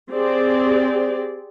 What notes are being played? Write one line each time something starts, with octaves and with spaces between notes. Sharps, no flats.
C4 G4 G#4 D5